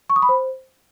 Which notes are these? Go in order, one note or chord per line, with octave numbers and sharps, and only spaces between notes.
C#6
D#6
B5
C5